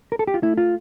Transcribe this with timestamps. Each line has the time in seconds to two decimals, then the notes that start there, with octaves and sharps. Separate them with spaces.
0.12 A#4
0.19 A4
0.27 G4
0.34 F4
0.42 A3 E4
0.58 F4